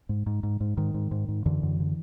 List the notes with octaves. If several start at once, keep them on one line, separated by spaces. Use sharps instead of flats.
G#2
G#2
G#2
G#2
G#2 D#3
G#2
G#2
G#2
F#2 D3 E3
F#2
D3